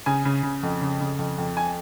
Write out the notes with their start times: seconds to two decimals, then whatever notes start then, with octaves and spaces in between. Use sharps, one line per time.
0.06 C#3 G#5
0.25 C#3
0.43 C#3
0.63 F2
0.81 C#3
1.01 C#3
1.19 F2
1.38 F2
1.57 G#5